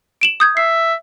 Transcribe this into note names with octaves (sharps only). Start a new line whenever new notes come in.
D7 E7 F#7
D#6 G6 G#6
E5 C7